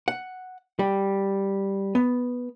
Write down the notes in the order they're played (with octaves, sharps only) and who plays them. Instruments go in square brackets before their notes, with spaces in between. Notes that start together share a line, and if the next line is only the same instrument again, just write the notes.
[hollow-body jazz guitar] F#5
G3
B3